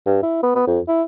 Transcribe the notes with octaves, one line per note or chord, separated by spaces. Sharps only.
G2
E4
B3
B3
F2
E4